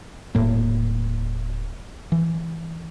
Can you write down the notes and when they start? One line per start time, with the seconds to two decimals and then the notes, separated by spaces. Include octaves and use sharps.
0.35 D#1 A2 A#3
2.12 E3